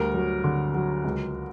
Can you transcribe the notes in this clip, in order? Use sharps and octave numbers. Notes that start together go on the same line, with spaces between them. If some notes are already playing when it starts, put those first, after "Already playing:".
Already playing: D2 G3 A#4
F#3
D3
F#3
C#2